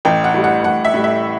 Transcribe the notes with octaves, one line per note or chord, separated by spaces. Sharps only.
A1 G5
F#5
A2 G3
F#5
A1 F#5
E5
A2 G3
E5